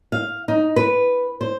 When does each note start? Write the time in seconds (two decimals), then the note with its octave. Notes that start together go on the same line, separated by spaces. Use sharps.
0.12 F5
0.48 D#4
0.76 B4
1.41 C5